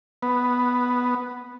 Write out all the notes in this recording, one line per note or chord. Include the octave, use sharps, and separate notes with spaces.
B3